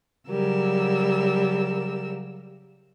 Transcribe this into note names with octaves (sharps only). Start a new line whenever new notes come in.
C#3 F#3 G3 A#4 E6